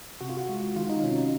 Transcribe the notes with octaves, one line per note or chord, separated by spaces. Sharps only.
C3 F#4
F4
F#4
G#3
D#3 F4
D#4
C3 C#4
D#4